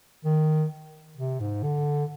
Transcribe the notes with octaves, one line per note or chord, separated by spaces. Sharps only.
D#3
C3
G#2
D3